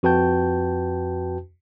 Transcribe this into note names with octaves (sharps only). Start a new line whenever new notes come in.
F2 F#4 B4 G5 A5 G6